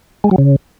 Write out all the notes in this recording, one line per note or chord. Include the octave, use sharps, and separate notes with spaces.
G#3
F#3
C#3